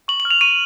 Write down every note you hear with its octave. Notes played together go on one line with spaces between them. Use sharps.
C#6 F#7
F#7
F6
F7
C#6 D#7